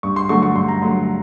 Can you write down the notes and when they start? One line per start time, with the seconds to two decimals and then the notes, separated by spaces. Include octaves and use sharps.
0.03 G2 C#6
0.16 C6
0.29 D3 F#3 A3 C#6
0.43 C#6
0.56 G2 C6
0.68 A#5
0.82 D3 F#3 A3 C6